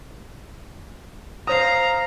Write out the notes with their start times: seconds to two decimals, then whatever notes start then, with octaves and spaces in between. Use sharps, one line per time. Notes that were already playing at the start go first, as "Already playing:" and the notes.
1.47 C5 F5 A#5 D#6